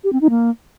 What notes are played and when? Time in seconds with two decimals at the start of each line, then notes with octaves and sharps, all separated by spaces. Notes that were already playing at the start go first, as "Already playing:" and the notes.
0.04 G4
0.13 C4
0.21 D#4
0.30 A#3